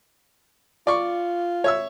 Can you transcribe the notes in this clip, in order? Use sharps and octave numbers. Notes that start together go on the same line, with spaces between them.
F4 D5 C#6
C#5 E5 E6